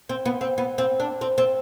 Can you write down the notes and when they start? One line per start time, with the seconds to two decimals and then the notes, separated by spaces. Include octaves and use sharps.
0.09 C4
0.25 B3
0.41 C4
0.58 B3
0.78 C4
1.00 D4
1.21 C4
1.38 C4